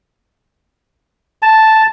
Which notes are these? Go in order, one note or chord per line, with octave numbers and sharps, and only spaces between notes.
A5